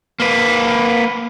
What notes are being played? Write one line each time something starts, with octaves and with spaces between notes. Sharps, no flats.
A#3 B4